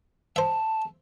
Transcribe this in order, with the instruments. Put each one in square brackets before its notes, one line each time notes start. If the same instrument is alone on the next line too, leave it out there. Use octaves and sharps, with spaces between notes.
[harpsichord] C5 E5 [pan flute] A5